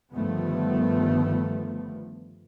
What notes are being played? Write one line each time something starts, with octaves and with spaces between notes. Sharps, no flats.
G1 G2 D#3 F3 A3 B3